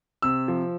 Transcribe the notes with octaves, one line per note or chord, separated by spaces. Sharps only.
C3 E6
F3